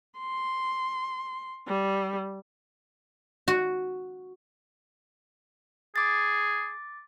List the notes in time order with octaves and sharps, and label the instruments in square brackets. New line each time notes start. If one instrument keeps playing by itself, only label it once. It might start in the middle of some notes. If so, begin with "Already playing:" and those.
[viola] C6
G3
[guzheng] F#4
[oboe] G#4 [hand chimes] D6 A6